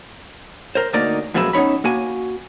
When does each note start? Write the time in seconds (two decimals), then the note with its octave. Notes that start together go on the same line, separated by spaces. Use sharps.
0.75 A#4 C5
0.93 D2 A3 A#3 D#4 D5 A#5
1.34 F#2 A#2 F3 G#3 B4 E5
1.53 B3 C#4 D#4 C#5 B5
1.84 A#3 F#4 G#5